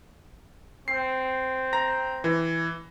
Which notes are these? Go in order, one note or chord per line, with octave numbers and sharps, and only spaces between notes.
C4 C7
A#5 A#6
E3